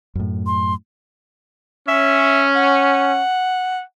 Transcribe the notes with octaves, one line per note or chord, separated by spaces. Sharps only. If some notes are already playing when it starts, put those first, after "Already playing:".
F#2 A2
C6
C#4 E5
F#5